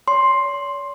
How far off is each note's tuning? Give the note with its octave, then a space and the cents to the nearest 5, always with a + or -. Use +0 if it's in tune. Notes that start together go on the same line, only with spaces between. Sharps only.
C#5 +45 C6 +10